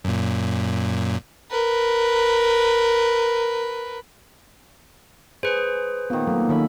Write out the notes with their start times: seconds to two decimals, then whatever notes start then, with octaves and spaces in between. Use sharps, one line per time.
0.04 F#2 A#2
1.50 A#4 B4
5.43 G#4 B4 C5
6.10 A#2 D#3 B3
6.27 F#3 A3 A#3 A4
6.49 D#3 C#4 A4 E5 B5